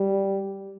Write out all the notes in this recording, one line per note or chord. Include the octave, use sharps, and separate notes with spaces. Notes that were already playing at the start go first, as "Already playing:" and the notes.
Already playing: G3